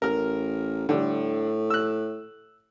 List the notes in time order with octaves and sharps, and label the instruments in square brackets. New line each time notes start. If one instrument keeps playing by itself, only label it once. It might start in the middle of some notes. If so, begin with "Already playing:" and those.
[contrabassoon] A1 [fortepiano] A#4 F6
[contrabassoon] A2 [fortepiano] D3 G3
[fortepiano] E6 F#6